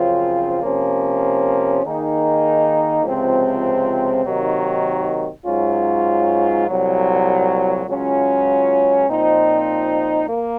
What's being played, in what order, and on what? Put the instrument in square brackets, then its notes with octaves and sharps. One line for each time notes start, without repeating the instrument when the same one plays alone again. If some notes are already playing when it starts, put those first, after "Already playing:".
Already playing: [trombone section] F#2 C#3 F3 C4 F4
C3 F3 A#3 C#4
D#3 A#3 D#4 G#4
C#2 C3 F3 C4
C3 D#3 F#3 A#3 D#4
G#2 F#3 C#4 F4
C2 A#2 F#3
C#2 C#3 F#3 C#4 F4
A#2 F3 C4 D#4
A#3